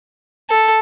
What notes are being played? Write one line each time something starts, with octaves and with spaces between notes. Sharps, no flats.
A4